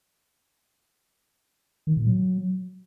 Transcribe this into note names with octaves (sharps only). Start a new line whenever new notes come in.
D#3
A#2
F#3